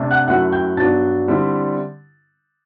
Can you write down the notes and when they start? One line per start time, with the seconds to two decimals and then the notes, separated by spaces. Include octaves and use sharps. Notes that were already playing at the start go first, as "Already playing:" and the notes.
Already playing: C3 A3 D4
0.11 F#5 F#6
0.27 F#2 F#3 A3 E4 F#5 F#6
0.52 G5 G6
0.77 G2 F#3 B3 D4 A5 A6
1.28 D3 G3 C4 E4